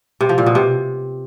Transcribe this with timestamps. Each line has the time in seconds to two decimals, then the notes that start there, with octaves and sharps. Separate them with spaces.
0.21 C3
0.29 F3
0.38 A#2
0.46 B2
0.55 C3